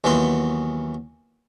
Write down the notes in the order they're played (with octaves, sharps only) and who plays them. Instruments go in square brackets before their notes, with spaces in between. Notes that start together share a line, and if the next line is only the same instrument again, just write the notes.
[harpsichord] D#2 E3 F#3 B3 F#4 C6